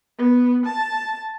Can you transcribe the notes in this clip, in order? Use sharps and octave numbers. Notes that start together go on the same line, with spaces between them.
B3
A5